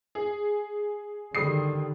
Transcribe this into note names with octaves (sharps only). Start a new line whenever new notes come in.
G#4
D3 D#3 G3 D#6 C7